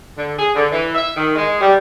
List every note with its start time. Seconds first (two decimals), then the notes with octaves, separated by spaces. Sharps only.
0.16 D3
0.39 G#4
0.55 D3
0.71 E3
0.95 E5
1.16 D#3
1.35 G#3
1.61 G3